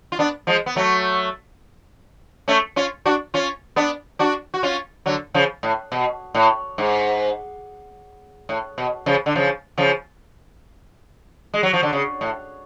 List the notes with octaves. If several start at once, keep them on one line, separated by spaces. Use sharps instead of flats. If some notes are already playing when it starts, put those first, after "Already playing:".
F4
B3 D4
F3 G#3
B3
F#3 A3
A3 C#4
C#4 F4
D4 F#4
C#4 F4
B3 D4
D4 F#4
F#4
C#4 F4
D3 F#3
C#3 F3
A2
B2
A2
G#2
A2
B2
C#3 F3
D3
C#3 F3
C#3 F3
G#3
F#3
F3
D3
C#3
A2